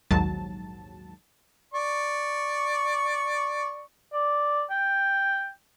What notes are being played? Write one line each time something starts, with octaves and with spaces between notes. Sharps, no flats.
A#1 D#2 G#2 F#3 A5
D5 C#6
D5
G5